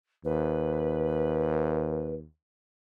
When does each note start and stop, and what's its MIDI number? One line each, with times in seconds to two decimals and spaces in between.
0.25 2.26 39
0.25 2.15 71